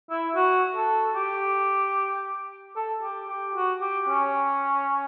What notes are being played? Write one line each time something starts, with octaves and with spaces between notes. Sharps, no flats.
E4
F#4
A4
G4
A4
G4
G4
F#4
G4
C#4